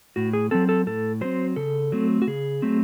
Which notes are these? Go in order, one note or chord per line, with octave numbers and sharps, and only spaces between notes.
A2 F#4
G#4
F#3 C4 A4
A4
A2 A4
F#3 C4 C5
C#3 A4
F#3 A3 C4
F#4
C#3 G#4
F#3 A3 C4